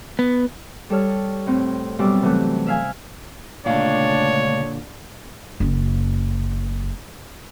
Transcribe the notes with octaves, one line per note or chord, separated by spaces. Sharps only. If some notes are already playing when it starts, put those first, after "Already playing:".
B3
G3 A4 C#5 F6
A2 C4
F#2 B2 G3 D6 E6
C3 E3 F#3 A3 F#4
E5 F5 G#5
C#2 A#2 D3 A3 D4 C#5 F5
F#1 F#2